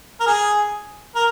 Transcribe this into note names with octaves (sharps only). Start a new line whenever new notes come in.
A#4
G#4
A#4